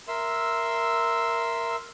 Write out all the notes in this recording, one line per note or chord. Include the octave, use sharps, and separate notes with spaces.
A#4 E5 C6 E6